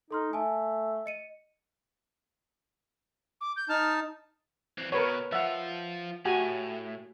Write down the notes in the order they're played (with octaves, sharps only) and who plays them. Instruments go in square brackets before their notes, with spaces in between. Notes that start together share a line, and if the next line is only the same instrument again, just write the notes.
[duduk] D#4 [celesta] A4 C6 F6
[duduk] A3 [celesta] G#5 A5
[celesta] D#5 C#7 D#7
[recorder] D6
G6
[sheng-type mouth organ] D#4 A5 [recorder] F6
[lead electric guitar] E3 C4
[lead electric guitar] B2 [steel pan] A#4 B4 C#5
[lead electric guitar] F3 F4 [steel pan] E5 F#5
[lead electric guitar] A2 [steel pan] F#4 G4 G#5